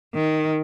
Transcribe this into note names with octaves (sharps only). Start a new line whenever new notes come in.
D#3